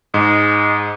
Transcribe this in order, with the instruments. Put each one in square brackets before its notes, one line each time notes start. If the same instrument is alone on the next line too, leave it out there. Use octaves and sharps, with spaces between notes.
[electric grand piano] G#2 [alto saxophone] G#3